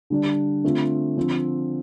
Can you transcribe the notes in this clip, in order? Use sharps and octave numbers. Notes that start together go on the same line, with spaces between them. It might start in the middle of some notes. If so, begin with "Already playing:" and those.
D3 G3 D4
D3 A3 C4 F4
D3 F3 C4